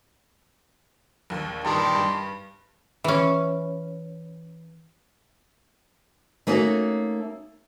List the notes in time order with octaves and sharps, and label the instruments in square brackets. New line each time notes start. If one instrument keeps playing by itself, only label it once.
[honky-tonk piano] A#1 D#2
[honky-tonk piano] A1 G2 A#2 [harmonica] D#3 G4 [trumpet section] D5 A5 C6
[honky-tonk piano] G2
[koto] E3 C#4
[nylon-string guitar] A3 A#3 C#4 D#4 F#4